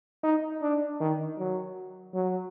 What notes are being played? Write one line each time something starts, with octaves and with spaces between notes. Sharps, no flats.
D#4
D4
D#3
F#3
F#3